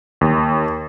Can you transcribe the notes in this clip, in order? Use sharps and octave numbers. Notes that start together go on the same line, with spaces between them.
D#2